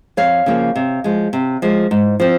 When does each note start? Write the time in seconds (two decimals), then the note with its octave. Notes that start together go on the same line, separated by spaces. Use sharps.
0.17 F2 C#5 F5
0.46 C#3 F3 A#3
0.76 C3
1.04 F3 G#3
1.33 C3
1.62 F3 G#3
1.91 G#2
2.20 F3 C4